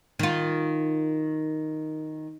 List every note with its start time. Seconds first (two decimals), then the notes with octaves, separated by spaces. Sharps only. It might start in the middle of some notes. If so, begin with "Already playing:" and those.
0.19 D#3 F4